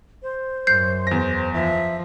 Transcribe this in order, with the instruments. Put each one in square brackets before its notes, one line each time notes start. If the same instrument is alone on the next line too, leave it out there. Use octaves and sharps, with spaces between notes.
[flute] C5
[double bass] F#2 [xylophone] G6 C7
[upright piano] E2 A#6
[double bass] F3 [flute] E5